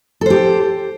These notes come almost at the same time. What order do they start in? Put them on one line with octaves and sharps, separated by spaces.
A4 C5 G4